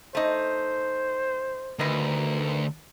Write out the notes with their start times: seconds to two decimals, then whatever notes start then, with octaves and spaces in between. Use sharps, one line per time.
0.15 A3 D#4 C5
1.79 D2 D#3 A#4 B4